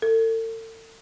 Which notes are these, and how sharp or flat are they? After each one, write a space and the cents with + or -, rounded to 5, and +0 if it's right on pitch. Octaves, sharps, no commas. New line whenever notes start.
A4 +40